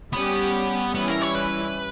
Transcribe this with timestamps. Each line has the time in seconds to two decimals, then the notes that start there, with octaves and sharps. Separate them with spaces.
0.12 G3 B3 C#4 G4
0.94 E3 G3 B3 C#4 E4
1.08 A#4
1.22 C#5
1.35 B4